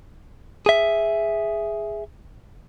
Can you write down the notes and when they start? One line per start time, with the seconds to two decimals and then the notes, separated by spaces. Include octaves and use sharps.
0.66 G#4 E5